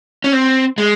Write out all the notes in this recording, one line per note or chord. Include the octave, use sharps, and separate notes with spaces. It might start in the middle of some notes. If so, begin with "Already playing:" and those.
C#4
C4
G#3